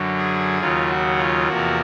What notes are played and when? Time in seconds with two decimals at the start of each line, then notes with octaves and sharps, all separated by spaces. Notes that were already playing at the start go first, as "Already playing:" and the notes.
Already playing: F#2 D3 F#3
0.17 G#4
0.61 D#2 C#3 F#3 F4
0.90 F#4
1.18 F4
1.48 E2 C3 F3 A#3 F#4